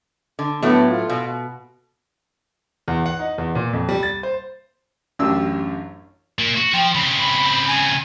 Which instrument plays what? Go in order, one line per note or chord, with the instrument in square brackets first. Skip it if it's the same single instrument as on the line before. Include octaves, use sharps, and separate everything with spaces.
[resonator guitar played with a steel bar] D3
[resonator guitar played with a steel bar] A2 F#3 A3 [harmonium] B3
[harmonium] F4
[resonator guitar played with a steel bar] B2
[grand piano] E2
F#5
D#4
E2
A#2
F2
G3
A6
C5
[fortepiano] A1 F#2 D4 G4 E6
[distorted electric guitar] A#2 A#3
F#4
[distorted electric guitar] F3 [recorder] G5
[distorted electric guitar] C#3 C4 [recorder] B5
[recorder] G#5